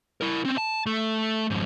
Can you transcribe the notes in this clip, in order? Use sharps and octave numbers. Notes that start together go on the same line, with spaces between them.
E4 A#4
C4 C#4
A5
A3 A4
F2 G#2